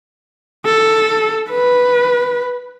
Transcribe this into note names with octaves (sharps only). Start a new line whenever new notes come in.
A4
B4